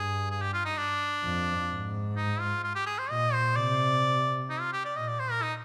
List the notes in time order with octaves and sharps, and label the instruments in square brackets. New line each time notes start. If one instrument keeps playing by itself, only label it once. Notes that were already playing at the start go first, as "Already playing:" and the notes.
Already playing: [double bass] G2 [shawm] G#4
[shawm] G#4
G4
F4
D#4
D4
[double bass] F2
G#2
[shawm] D#4
F4
F4
G4
G#4
C5
[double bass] A#2 [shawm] D#5
[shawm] C5
[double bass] C3 [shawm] D5
[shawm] D#4
F4
G4
D5
[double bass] A#2 [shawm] D#5
[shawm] D5
C5
A#4
D#4